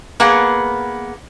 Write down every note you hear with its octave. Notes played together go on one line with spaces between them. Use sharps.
A#3 B3 G#4 F#5